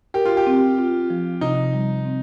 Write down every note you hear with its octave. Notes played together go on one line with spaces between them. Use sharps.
G4 A#4
F4
G4
C4
F4
F3
C3 D#4
G3
C4